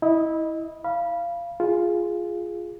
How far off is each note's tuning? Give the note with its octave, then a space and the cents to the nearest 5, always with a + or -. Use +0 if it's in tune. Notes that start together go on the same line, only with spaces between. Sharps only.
E4 -20 D#5 +0
F5 -20 B5 -25
F4 +0 G#4 +0